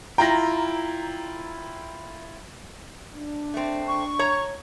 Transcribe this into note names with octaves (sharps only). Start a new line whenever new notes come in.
E4 F4 G5 A#5 A#6
D4
A3 C4
C#6
C#5 A#5